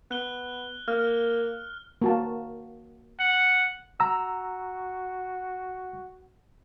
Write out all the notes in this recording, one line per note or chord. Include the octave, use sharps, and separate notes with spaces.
B3 F#6 G7
A#3 F6
A#3 F#4 A5
F#5
F#4 A#5 E6